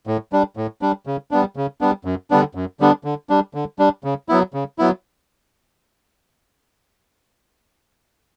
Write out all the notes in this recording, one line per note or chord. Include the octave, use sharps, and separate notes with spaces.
A2
G3 D4
A2
G3 D4
C#3
G3 B3 D4
C#3
G3 B3 D4
F#2
D3 G3 B3 D4
F#2
D3 G3 B3 D4
D3
G3 D4
D3
G3 D4
C#3
F#3 B3 E4
C#3
F#3 B3 E4